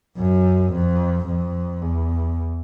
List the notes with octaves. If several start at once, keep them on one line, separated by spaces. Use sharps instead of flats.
F#2
F2
F2
E2